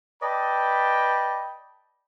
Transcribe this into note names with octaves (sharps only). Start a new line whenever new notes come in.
B4 D5 D#5 G5 A5 B5